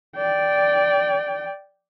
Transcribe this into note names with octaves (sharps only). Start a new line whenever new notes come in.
D5 G5